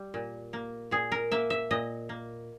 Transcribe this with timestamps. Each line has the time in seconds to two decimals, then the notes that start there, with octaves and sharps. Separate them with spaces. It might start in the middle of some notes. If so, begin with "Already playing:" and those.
Already playing: G3
0.14 A#2
0.53 A#3
0.91 A#2 G#4
1.12 A#4
1.32 A#3 E5
1.50 E5
1.71 A#2 D#5
2.09 A#3